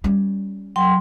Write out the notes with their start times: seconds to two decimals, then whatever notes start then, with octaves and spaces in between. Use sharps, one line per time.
0.04 G3 C#4
0.76 F#3 G5 C6